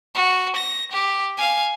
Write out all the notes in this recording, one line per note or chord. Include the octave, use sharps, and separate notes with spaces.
F#4
A#6
G4
F5 G#5